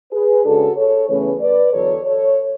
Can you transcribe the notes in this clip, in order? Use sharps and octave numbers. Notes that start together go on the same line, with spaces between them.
G#4 B4
C#3 G#3 D4 F#4 A4
A4 C#5
E2 C#3 E3 A3 C#4 G#4 B4
B4 D5
E2 D3 F#3 A4 C#5
A4 C#5